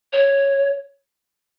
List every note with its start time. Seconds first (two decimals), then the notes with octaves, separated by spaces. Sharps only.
0.13 C#5